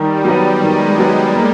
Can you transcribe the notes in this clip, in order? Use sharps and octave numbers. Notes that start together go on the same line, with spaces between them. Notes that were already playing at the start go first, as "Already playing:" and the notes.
Already playing: D#3 G3
F#3 B3
D#3 G#3
F#3 B3
A#3